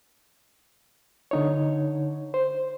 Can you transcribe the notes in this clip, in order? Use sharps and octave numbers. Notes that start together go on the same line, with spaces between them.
D3 D#4 C#5
C5